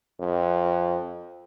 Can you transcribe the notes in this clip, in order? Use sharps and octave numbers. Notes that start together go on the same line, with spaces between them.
F2